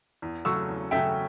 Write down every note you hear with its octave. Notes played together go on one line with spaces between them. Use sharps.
E2
C#3 F#3 A3 C#4 C#6 E6
E2
C#3 F#3 A3 C#4 E5 G5